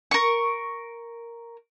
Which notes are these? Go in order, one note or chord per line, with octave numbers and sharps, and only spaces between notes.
A#4 C#6